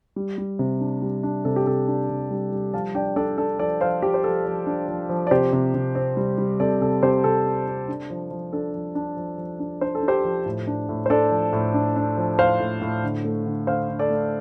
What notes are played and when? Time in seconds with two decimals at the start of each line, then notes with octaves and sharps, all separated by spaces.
0.16 G3
0.38 G3
0.59 C3
0.80 D4
1.02 G3
1.23 D4
1.45 C3 A4
1.56 G4
1.66 C3 A4
1.88 D4
2.09 C3
2.31 G3
2.52 G3
2.73 F3 F5 A5
2.95 D4 D5 G5
3.16 D4 A4 D5
3.38 D4 A4
3.59 F3 A4 D5
3.81 F3 C5 F5
4.02 F3 G4
4.14 C5
4.24 F3 A4
4.46 F3
4.67 D4
4.88 F3
5.09 F3
5.27 D5
5.31 C3 G4 C5
5.53 C3
5.74 C3
5.95 C4
6.17 G3
6.38 G3
6.60 C3 A4 D5
6.81 C3 A4
7.02 C3 G4 C5
7.24 C3 A4
7.45 C4
7.67 C4
7.88 D4
8.10 F3
8.31 F3
8.53 D4 A4
8.74 F3
8.95 D4
9.17 F3
9.38 F3
9.60 D4
9.81 D4 C5
9.95 A4
10.03 D4
10.08 G4 C5
10.25 F3
10.46 A2
10.67 D4
10.89 A2
11.06 C5
11.10 D4 A4 D5
11.31 F3
11.53 A2
11.74 D4
11.96 D4
12.17 F3
12.39 A2 C5 F5
12.60 A2
12.82 A2
13.03 D3
13.25 A3
13.46 D3
13.67 D3 C5 F5
13.89 D3
13.99 A4 D5
14.10 A3